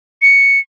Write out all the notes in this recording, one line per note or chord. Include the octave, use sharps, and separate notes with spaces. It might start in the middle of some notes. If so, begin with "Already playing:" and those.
C#7